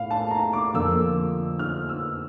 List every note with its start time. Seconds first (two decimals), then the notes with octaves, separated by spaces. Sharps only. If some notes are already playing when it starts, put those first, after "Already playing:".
Already playing: A2 F5
0.11 A5
0.31 A#5
0.53 D6
0.74 F2 D3 F3 A#3 E6
1.59 F6
1.89 E6